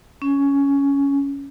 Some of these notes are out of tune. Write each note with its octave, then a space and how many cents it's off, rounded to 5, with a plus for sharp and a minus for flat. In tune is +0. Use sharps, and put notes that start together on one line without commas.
C#4 +10